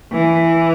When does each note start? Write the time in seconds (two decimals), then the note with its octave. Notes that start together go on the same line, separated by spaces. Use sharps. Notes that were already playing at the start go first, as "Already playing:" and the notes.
0.12 E3